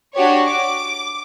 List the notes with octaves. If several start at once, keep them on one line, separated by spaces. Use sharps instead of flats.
D4 F#4 G4 C#5
D6